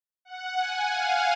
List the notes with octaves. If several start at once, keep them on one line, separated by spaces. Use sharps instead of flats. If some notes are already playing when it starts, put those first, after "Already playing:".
F#5
G#5
F5